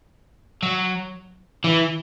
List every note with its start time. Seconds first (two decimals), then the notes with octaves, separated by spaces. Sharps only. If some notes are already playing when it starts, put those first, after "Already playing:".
0.63 F#3
1.64 E3